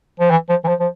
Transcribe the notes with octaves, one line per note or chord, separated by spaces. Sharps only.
F3
E3
F3
E3
F3
F3